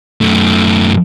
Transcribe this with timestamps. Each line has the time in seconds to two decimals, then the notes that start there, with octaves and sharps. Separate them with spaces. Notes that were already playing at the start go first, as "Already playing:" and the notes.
0.21 F#2 A3